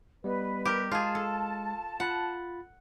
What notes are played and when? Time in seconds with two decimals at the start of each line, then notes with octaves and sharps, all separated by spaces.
0.24 G3 B3 B4 D#5
0.65 G4 A#4
0.91 G#3 F4 G#4 A5
1.15 A4
2.00 F4 F#5 B5 A6